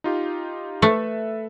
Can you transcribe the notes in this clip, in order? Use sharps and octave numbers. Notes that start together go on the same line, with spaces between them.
D#4 F4 G4
A3 A4 B4 E5